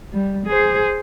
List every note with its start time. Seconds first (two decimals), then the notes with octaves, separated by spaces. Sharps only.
0.12 G3
0.47 G#4 C5